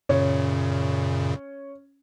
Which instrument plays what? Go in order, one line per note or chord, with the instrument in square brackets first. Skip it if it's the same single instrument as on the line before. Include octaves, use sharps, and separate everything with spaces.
[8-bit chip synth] F#2 A#2 C#3 [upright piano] C#4